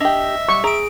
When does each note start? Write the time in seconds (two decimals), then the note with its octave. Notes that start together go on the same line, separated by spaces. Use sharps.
0.01 D4 G4 D#5 E5
0.49 G3 C#6
0.64 G#4 A#5 D7